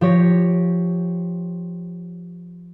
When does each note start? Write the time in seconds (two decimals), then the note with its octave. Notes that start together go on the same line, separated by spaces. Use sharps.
0.01 F3 G4 C#5 A#6